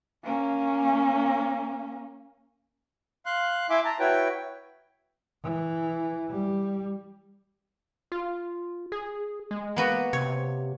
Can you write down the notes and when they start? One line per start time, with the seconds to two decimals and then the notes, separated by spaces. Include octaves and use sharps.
0.24 A#3 C#4
3.26 F5 C6 F#6
3.70 E4 E5 G#5 C6 D6
3.85 A5 A#5
4.00 E4 F#4 B4 C#5 G5
5.44 E3
6.30 G3
8.12 F4
8.92 G#4
9.51 G#3
9.76 A#3 B3 F#4
10.13 C3 C#5